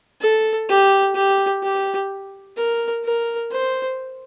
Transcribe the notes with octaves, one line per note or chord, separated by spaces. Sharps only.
A4
G4
G4
G4
A#4
A#4
C5